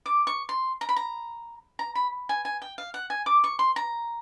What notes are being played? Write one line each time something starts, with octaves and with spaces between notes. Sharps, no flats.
D6
C#6
C6
A#5
B5
A#5
A#5
B5
G#5
G#5
G5
F5
F#5
G#5
D6
C#6
C6
A#5